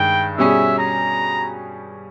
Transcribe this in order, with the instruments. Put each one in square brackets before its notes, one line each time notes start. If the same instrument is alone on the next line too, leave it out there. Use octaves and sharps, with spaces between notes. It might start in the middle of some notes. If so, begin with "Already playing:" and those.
Already playing: [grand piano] G2 D#3 G#3 [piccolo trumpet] G5
[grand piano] B2 G3 C#4 G#4 [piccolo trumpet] E5
[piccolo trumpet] A#5